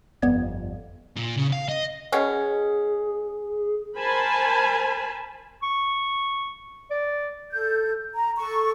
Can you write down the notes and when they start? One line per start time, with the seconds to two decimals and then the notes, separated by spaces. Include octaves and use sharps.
0.22 G1 F2 B3 D5 G#6
1.16 A#2
1.37 C#3
1.53 F5
1.69 D#5
2.12 B2 C#4 G#4
3.99 A#4 C5 G#5 A5 B5
5.63 C#6
6.91 D5
7.52 A4 G6
8.15 A#5
8.38 A4 C#6